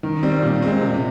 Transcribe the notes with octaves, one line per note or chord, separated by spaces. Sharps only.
D#3
G3 C4
A#2
G#3 C4
C3